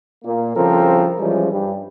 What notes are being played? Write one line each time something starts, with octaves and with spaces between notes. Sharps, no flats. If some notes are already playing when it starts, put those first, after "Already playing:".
A#2 A#3
C2 C#3 F3 C4 A4 A#4
E3 F3 G3 G#3 C#4
G2 G3